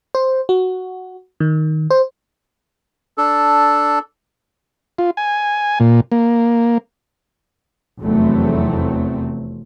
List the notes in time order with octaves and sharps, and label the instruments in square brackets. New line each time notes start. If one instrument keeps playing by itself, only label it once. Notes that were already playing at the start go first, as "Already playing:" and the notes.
[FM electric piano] C5
F#4
D#3
C5
[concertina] D4 A4
[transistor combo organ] F4
G#5
A#2
A#3
[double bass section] F1 E2 F#3 A3 C4